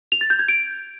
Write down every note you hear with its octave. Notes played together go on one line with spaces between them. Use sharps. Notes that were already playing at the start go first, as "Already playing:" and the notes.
F7
A6
G6
G#6
D7